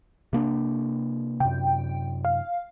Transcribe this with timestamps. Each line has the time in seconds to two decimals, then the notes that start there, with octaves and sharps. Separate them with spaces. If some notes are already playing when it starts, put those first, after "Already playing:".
0.33 C3 A#3 D4
1.40 F#2 C3 G5
2.25 F5